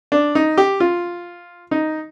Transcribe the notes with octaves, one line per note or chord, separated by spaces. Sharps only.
D4
D#4
G4
F4
D#4